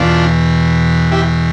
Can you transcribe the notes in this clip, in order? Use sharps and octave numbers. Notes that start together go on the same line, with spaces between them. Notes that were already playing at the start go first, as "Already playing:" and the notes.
Already playing: E2 B2 D4 F4
E4 G4